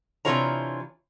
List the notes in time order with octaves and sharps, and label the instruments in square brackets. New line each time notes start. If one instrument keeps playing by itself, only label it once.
[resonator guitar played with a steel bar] C3 E3 D4 F4 C#5 A#5